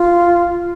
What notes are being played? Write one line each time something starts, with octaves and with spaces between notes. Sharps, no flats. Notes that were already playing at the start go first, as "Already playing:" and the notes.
Already playing: F4